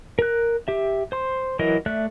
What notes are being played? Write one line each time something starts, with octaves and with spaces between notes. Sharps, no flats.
A#4 F#6
G4 E5
C5 C6
E3 F#3 E4 A#4 D#5
A3 D5 E5 F#6